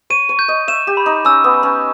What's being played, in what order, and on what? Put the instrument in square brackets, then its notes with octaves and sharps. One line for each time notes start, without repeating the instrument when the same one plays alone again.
[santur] C#5 [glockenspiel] D#7
[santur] C#5
[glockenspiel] G6
[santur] D#5
[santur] E5 [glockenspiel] E7
[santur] G4
[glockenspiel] B5
[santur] D#4
[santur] C#4 [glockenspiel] E6
[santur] B3
[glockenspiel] E6
[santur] C#4